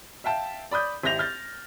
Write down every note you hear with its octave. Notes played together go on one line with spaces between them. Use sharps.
E5 F5 G5 A5
D5 B5 D#6 G6
G#1 E4 G4 G6 A#6 F7
F6 G6 A6